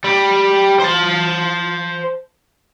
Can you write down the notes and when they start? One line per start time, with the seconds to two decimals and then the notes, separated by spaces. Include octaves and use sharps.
0.04 G3
0.79 C5 A5